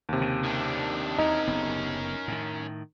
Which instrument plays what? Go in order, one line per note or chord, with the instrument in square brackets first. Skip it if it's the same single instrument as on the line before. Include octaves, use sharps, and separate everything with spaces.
[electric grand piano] D#2 C3
[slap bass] C#3
[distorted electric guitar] D#3 D4
[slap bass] E2 [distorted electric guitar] C#4 A#4 [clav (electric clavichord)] D#4
[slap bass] F#1 B3
A2 D#3